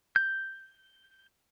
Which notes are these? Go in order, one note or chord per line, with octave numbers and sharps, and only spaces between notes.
G6